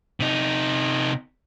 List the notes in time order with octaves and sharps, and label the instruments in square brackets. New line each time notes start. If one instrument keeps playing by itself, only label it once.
[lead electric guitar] C3 D#4